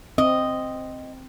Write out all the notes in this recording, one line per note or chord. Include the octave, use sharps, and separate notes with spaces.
C4 D#5